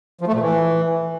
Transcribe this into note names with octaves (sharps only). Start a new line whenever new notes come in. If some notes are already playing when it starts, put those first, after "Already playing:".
F3
A3
A#2
E3